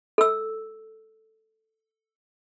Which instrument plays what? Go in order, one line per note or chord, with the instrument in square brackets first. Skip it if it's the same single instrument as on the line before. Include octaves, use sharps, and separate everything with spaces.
[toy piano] A4 E6